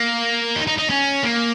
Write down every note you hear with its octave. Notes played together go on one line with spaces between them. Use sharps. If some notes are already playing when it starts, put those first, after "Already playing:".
Already playing: A#3
D#4
D#4
D#4
C#4
A#3